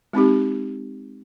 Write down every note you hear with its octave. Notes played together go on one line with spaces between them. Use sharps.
G#3 C4 D#4 G4